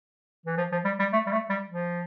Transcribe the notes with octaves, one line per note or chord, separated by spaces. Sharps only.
E3
F3
F3
G3
G3
A3
G3
A3
G3
F3